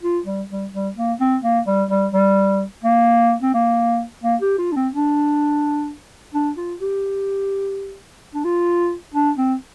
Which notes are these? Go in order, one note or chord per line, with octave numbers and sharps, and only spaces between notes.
F4
G3
G3
G3
A#3
C4
A#3
G3
G3
G3
A#3
C4
A#3
A#3
G4
F4
D4
C4
D4
D4
F4
G4
D4
F4
D4
C4